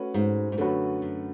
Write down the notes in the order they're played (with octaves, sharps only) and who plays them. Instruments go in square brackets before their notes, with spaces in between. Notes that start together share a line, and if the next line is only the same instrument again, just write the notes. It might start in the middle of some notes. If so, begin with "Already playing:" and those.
Already playing: [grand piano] A3 C#4 F#4 B4
[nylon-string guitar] G#2
G#2
[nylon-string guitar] F#2 [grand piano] D3 A3 C#4 F#4 B4
[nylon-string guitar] F#2